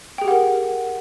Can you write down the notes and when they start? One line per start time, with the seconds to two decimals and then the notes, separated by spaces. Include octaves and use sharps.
0.18 G5
0.21 G#4
0.25 G4
0.28 F#5
0.31 A#4